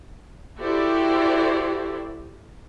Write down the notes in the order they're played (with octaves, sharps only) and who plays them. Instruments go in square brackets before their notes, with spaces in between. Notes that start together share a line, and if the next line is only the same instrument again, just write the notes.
[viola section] E4 F#4 G4 A4 C5 D5